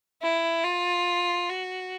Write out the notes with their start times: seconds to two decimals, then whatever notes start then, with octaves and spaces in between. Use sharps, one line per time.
0.22 E4
0.64 F4
1.49 F#4